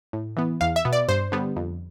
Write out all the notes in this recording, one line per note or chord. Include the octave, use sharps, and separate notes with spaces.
A2
E3 B3
E2 F5
E5
B2 B3
D5
G2 C5
D3 G3 B3
F2